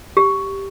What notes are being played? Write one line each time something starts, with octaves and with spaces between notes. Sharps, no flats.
G4